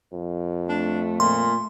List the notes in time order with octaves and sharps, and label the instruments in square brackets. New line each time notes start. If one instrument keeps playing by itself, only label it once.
[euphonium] F2
[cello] A3 [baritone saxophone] D4
[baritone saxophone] A#2 [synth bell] C6